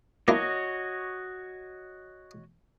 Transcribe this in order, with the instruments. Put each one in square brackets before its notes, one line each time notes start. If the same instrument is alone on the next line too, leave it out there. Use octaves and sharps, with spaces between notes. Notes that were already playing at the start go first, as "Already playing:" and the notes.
[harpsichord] A#3 D4 E4 [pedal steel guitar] F#4 C#5 D#5